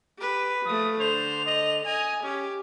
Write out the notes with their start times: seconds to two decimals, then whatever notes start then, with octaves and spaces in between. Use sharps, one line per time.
0.18 G4 B4
0.65 F3 A3 D#6
1.00 D3 C5 F7
1.46 D#5
1.86 D#5 G#5
2.23 C#4 G4